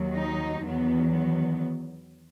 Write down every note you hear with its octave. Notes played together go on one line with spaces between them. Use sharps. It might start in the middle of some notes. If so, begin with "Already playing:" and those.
Already playing: D#2 D#3 F#3
D#4
E2 D#3 F#3 B3
B3